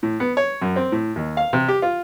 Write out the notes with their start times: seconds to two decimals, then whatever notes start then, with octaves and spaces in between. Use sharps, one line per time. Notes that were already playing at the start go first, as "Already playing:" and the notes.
0.03 A2
0.20 B3
0.37 C#5
0.62 F#2
0.76 C4
0.92 A2
1.16 D#2
1.37 F5
1.53 C3
1.68 G4
1.82 F4